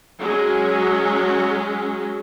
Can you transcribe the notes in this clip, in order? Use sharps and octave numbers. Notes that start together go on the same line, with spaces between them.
F#3 G#3 C#4